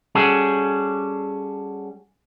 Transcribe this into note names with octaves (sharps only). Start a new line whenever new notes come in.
G3 C#4 F#4 G#4 A4